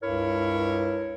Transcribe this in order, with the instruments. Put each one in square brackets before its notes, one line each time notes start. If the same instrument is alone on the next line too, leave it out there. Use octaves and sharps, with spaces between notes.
[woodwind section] C#2 G2 E4 A#4 C#5